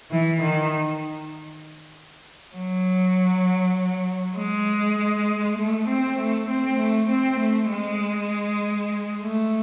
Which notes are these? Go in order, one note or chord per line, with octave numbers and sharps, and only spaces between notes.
E3
D#3
F#3
G#3
A3
C4
A3
C4
A3
C4
A3
G#3
A3